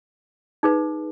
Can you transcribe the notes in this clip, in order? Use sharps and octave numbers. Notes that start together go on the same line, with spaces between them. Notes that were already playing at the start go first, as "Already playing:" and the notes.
D#4 G#4 B4